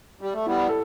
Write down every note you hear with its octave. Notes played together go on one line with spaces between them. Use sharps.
G3
A3
G3 B3 E4
A4